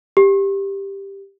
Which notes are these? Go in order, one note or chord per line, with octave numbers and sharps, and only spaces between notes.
G4